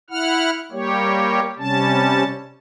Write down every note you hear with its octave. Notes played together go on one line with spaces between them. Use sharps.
E4 F#5 F6
G3 A#3 G4 C#5
C3 G3 C#4 A5